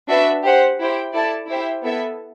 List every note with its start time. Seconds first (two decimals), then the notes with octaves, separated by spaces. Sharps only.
0.09 D4 F#4 B4 E5
0.44 G4 C5 F#5
0.79 E4 G4 C5 G5
1.14 E4 A4 D5 A5
1.49 E4 G4 C5 E5 G5
1.84 B3 E4 A4 E5